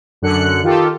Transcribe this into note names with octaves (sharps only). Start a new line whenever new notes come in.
F#2 D3 F#6 C#7
D#3 F4 G4 A4